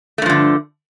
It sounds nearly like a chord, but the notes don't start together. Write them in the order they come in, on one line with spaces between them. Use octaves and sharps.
A3 G2 F3 D3